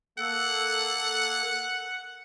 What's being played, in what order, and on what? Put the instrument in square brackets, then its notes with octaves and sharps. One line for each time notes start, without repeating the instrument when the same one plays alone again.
[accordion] A#3 A4 [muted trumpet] F#5